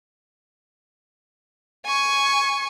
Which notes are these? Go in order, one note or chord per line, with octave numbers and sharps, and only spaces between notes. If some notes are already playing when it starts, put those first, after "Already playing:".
G#5 C#6